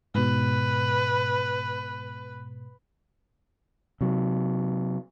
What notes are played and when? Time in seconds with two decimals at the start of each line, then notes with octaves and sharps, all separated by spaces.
0.14 G#2 B2 B4
4.01 C3 F#3